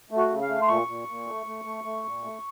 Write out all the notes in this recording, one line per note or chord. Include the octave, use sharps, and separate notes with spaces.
A3
F#4
C#3
F5
A3
C6
A#2 C#6
A#2
A#2
A3
A3
A3
A3
A#2
A3